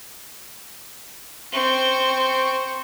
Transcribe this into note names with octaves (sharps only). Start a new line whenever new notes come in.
C4 C#6